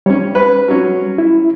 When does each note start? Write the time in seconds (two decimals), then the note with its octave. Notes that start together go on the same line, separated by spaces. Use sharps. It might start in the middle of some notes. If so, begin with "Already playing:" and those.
0.06 G3 C#4 C#5
0.35 B4
0.68 F#3 C#4
1.18 E4